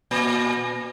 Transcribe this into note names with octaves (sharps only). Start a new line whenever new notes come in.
A#2